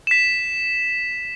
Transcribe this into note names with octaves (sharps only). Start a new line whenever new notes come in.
B6 E7